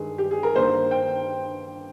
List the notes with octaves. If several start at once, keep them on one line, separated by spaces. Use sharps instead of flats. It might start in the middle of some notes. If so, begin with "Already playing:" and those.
Already playing: G2 D#3 G#3 G#4
G4
G#4
A#4
G2 D#3 A#3 C5
G5